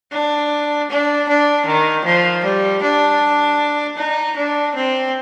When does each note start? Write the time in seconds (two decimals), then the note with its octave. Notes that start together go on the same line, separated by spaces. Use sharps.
0.12 D4
0.90 D4
1.29 D4
1.66 D#3
2.05 F3
2.44 G3
2.83 D4
3.98 D#4
4.36 D4
4.75 C4